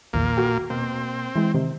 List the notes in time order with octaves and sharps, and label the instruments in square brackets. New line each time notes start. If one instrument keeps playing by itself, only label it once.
[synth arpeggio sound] A#1 E2 D#3 [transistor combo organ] A#2 A#3
[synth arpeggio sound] F#4 A4 G5
[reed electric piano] B2 A#3 [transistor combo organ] C4
[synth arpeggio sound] E3 G#3 [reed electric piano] E4
[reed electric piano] C3 [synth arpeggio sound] D#3